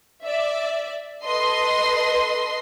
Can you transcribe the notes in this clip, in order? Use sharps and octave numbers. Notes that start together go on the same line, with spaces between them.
D5 E5
A4 B4 D#5 C6 C7